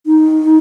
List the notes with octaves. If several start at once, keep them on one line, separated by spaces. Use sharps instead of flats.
D#4